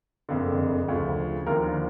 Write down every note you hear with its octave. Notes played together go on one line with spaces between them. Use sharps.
F#1 F2 D3
D2 C#3 F3
D#2 D3 F3 A#4